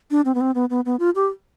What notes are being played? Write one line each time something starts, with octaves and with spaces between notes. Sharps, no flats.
D4
C4
B3
C4
B3
B3
B3
F4
G4